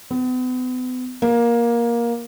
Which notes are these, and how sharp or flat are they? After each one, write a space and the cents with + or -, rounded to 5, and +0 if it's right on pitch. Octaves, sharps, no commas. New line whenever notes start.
B3 +40
A#3 +15